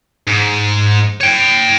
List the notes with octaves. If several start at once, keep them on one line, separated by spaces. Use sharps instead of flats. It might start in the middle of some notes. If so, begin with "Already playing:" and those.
G#2
C#5 G5